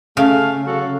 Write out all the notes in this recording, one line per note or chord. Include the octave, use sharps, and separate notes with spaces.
C#3 A3 F5
F#3 F#4 A4